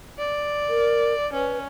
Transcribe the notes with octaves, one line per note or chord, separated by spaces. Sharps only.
D5
A#4
C#4 B4